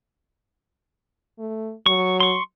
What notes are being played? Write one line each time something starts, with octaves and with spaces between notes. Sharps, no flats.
A3
F#3 C#6
C6 C#6